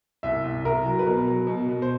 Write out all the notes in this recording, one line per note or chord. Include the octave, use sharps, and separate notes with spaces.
C2 E5
C2
C2 A#4
F#3
B4
B2 A#4
F#3
B2
B2
C5